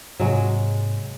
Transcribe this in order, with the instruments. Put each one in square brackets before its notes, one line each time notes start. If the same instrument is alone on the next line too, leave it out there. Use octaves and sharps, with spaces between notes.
[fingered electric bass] G#2 C3 [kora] F#3 G#3